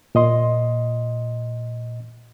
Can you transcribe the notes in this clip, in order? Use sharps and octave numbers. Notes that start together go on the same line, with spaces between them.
A#2 D#5 C6